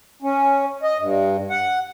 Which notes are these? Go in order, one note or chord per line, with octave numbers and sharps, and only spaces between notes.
C#4
D#5
G2
F#5